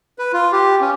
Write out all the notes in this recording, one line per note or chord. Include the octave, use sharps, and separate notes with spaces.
B4
F4
G4
C#4